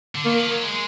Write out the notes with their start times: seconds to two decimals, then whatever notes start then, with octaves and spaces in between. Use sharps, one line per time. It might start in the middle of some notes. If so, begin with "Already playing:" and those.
0.15 D3
0.25 D#3 A#3
0.38 F3
0.51 F#3
0.63 G#3